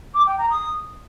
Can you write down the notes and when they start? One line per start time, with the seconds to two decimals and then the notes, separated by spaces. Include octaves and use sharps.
0.14 D6
0.26 G5
0.38 A#5
0.50 D#6